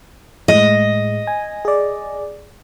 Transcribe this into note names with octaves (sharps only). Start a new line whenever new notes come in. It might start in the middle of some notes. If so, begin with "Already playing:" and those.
A2 G#3 D#5
G#5
G#4 D5